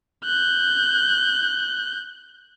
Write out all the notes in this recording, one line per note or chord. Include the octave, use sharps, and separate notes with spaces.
F#6 G6